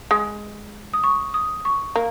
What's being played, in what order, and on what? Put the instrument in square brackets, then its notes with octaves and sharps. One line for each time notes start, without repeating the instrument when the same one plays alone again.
[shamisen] G#3
[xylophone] D#6
C#6
D#6
C#6
[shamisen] A#3